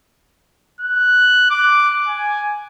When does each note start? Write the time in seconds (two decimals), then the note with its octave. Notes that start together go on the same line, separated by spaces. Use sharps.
0.80 F#6
1.50 D6
2.08 G#5